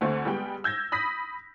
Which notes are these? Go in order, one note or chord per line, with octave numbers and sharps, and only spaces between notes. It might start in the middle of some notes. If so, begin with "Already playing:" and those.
D2 D3 A3 C4
G3 G#3 B3 G5
E6 G6 G#6 A#6
B5 D#6 A#6 B6